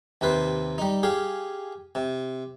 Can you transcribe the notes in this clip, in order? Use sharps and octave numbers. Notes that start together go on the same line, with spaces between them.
D#2 C3 B4 C5
G3 D#4
G4 G#4 F5
C3